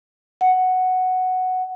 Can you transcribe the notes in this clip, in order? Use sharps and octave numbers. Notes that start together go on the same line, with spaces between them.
F#5